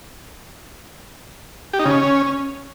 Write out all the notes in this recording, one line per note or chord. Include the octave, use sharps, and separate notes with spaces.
G4
D#4
C#3
C#4